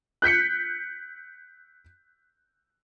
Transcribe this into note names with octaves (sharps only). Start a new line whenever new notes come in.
F#6 G6 B6 C#7